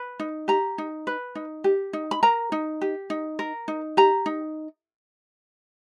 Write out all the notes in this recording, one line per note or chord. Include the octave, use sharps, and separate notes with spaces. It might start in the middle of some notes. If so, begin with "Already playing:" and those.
Already playing: B4
D#4
G4 A#5
D#4
B4
D#4
G4
D#4
B5
A#4 A#5
D#4
G4
D#4
A#4
D#4
G4 A#5
D#4